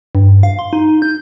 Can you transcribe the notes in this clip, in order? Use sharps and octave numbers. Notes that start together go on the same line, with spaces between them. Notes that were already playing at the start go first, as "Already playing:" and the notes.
G2
F5
C6
D#4
G6